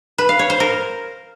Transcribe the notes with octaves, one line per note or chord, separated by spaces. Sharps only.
B4
F5
C#5
C5
A#4